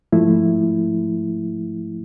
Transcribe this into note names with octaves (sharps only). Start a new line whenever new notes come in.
G#2 F3 A3 E4